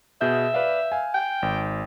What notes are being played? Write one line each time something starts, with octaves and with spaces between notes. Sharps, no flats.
B2 G#4 E5 G6
B4 D5 F5
F5 G#5
G5
G#1